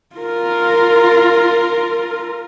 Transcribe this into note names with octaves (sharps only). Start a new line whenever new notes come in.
F4 A#4